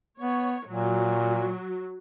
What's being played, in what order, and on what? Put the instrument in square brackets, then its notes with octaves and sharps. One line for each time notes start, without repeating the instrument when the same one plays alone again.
[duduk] B3 [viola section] C#5
[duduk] A#2 [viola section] F#3